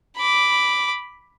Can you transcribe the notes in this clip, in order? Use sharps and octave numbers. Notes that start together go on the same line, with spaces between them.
B5 D6